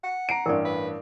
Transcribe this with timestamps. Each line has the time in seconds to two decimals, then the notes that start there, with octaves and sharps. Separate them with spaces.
0.03 F#5
0.29 A#5 C7 D7
0.46 A1 G2 A#4 D5
0.65 B4